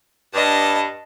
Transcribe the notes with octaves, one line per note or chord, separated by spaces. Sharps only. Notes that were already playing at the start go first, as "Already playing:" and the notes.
G2 D#5 A5